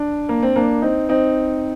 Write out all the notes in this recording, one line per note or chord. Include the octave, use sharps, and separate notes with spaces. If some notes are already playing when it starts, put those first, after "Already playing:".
Already playing: D4
A#3
C4
A#3 D4
C4 D#4
C4 D#4